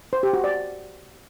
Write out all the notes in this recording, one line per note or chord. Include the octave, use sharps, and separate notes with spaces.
C5
G4
F#4
D5